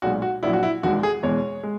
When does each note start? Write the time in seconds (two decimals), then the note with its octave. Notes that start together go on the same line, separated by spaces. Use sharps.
0.02 B1 A#2 G#3 F#4
0.22 F#4
0.43 A#1 A#2 F#3 E4
0.53 F#4
0.63 E4
0.83 E1 D#2 D#3 G#3 F#4
1.03 G#4
1.23 E2 B2 G#3 C#5
1.63 G#3